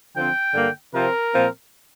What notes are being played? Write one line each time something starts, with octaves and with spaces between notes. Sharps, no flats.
D3 F3 C4 G5
G2 D3 A#3
C3 F3 C4 A#4
A#2 F3 C4